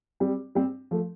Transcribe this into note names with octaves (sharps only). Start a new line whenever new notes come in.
G3 C4
G3 C4
F3 A3